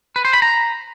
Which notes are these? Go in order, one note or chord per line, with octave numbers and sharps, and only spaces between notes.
B4
C5
B5
A#5